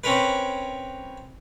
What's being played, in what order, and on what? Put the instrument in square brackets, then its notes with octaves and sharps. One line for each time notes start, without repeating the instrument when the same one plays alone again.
[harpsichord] C4 C#4 A#4 B4